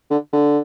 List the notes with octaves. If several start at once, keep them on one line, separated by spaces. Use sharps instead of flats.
D3
D3